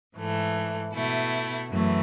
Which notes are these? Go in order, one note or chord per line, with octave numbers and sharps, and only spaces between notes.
G#2 E3 A3
B2 A3 E4
F#2 E3 A3